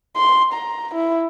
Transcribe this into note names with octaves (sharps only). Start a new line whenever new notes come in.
C6
A#5
E4